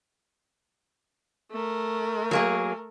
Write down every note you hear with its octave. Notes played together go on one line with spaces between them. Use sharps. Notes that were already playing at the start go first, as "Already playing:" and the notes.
A3 A#4
F#3 A#3 G#4